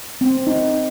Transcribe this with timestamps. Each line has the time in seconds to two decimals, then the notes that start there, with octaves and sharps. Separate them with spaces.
0.21 C4
0.47 D#4